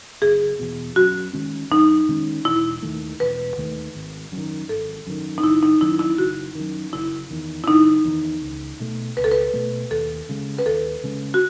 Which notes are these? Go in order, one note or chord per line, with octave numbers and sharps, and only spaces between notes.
F#1 G#4
E2 B2
F#2 F#4
D#3 G#3 C#4
F#2 D#4
D#3 G#3 C#4
E1 E4
D#2 D#3 A3
E1 B4
D#2 D#3 A3
G#1
F#2
D#3
G#1 A4
F#2 D#3
D#4
F#1 E4
D#4
F#2 D#3 E4
E4
F#1 F#4
F#2 D#3
F#1 E4
E2 D#3
E4
F#1 D#4
E2 D#3
C#2
B2 A3
C#2 B4
A4
B4
B2 A3
D#2 A4
C#3 G#3
B4
D#2 A4
C#3 G#3
F#4